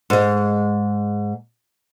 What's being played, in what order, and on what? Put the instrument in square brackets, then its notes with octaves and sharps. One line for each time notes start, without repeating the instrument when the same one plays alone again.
[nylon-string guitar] G#2 G#3